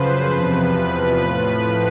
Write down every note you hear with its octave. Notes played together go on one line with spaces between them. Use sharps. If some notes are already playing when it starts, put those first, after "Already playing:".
Already playing: F#2 C#3 F3 B4 C5
E2 C3 F3 B4
B4
A2 F3
B4